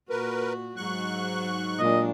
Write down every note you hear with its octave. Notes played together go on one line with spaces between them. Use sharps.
A#2 F#4 A#4 B4
G#2 F#3 C#6 F#6
A#2 F#3 G#3 D4 D#5